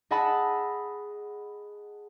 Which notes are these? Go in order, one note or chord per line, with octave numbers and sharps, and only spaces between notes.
G#4 D#5 F#5 A5 B5 E6